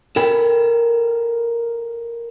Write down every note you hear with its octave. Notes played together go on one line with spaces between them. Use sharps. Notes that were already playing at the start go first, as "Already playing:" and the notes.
A4 A#4 G5 B5